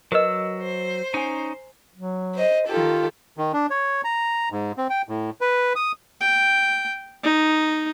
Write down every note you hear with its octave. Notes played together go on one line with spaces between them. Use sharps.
F#3 A#4 B4 D#5 E6
C5
C#4 D#4 G#5 A#5
F#3
C5 D#5
D#3 F4 G4 A4
D#3
D4
C#5
A#5
G#2
C4
G5
A2
B4
D#6
G5
D#4